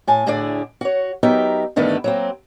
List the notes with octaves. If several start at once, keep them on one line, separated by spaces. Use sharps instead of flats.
A2 G#5 A5
D2 A2 D3 E4 G#4 D5
F#4 C#5
F#3 B3 D#4 G4 A#4 E5
G2 D3 D#3 A3 B3
F#3 A#3 C4